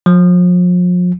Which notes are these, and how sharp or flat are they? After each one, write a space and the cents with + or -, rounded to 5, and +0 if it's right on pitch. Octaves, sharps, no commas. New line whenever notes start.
F3 +40